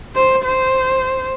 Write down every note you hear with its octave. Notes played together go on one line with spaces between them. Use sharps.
C5
C5